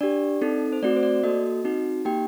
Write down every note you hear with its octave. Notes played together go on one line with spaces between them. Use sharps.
D4 G4 D5
C4 D#4 A4
C5
A3 C4 F#4 D5
C5
D5
A#3 F#4 A4 D#5
C4 D#4 F#4
A#3 D#4 G4 G5